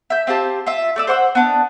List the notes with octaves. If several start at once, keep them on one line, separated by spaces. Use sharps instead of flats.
E5 G6
C4 F4 G4 A5
F4 E5
A3 D5 E6
C5 F#5 C#6 E6
B3 D4